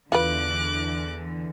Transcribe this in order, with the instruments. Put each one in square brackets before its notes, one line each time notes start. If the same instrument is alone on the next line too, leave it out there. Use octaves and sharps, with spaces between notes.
[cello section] E2 D3 E3 [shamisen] F4 B4 [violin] D6 F#6